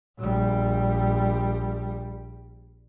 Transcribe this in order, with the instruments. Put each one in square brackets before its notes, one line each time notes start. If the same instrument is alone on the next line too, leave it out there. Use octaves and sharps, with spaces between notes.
[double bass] A#1 G3